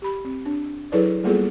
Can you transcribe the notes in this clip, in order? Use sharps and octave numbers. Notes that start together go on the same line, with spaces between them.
G4 B5
C4
D4
F#3 E4 G#4 A4 B4 D5
G3 A#3 B3 F4 G#4 A4